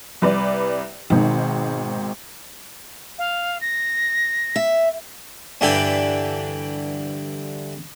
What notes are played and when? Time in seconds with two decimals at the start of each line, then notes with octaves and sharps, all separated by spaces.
0.22 C2 B4 D5
1.10 G#1 G#2 B2 D#3
3.18 F5
3.61 A#6
4.56 E5
5.61 G2 D3 E3 D4 E4 G4